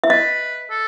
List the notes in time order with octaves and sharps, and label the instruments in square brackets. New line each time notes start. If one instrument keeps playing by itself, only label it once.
[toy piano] E5
[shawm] B4 [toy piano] D#5
[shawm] A4